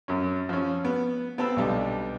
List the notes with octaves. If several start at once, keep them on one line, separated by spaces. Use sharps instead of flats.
F#2 C#4
F3 C#4
B3
B3 C4 A5 B5 E6
B1 D3 G3 A5